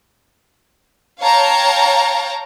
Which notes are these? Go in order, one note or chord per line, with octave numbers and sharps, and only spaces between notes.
C#5 F5 G5 A5 A#5